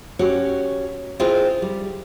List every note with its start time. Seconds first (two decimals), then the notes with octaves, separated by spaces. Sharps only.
0.19 C#4 F#4 G4 C#5
1.20 C4 E4 F4 G#4 C5
1.62 G3